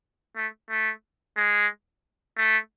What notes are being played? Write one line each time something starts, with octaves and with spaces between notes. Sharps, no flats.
A3
A3
G#3
A3